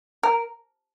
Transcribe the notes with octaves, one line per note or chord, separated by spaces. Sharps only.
A#4